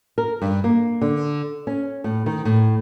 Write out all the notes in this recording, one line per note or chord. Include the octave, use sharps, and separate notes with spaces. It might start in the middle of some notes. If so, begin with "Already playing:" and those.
A#4
G2
A#3
D3
C#4
A2
D#3
A2